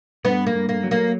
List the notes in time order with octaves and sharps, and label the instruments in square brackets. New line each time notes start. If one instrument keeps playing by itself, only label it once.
[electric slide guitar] G2 [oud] B3
[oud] A#3
[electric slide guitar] G2
[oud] A#3
[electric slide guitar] F#3
[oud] A#3